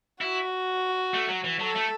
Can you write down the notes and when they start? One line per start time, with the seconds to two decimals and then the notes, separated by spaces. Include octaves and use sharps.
0.21 E4 F#4
1.14 A3
1.29 F#3
1.44 E3
1.59 F#3 A4
1.75 A3